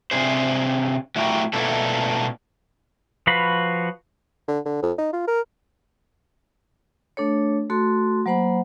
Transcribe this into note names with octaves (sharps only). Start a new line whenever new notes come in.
C3 D4 G#4 C5
F#3 A3 E4 F#4 G4 A#4
B2 A3 A#3 D4 E4 A4
F3 F#4 B4 F5 B5
D3
D3
F2
D#4
F4
A#4
A3 D4 A4 C#5
A3 F#4 A4 C6
F#3 A#3 C5 F#5 B5